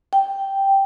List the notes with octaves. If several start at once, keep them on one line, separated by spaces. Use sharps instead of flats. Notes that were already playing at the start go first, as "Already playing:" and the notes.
G5